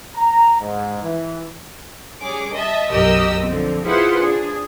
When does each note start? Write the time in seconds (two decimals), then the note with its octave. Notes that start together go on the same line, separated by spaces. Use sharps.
0.15 A#5
0.60 G#2
1.04 E3
2.21 G3 C#4 G#4 D6
2.54 D#5 E5 A5
2.91 B1 F#2 G4 A#4 D#5 E6
3.43 D3 F3 C4
3.85 E4 F4 G#4 B4 C5 F#5
4.20 D4 G#4